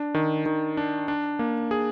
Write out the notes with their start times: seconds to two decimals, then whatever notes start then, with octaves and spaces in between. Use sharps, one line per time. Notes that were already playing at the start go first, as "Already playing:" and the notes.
Already playing: D4
0.14 D#3
0.46 D#3
0.77 D4
1.08 D4
1.39 A#3
1.71 G#4